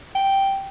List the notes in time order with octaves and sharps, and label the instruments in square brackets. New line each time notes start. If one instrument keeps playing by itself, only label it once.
[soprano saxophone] G5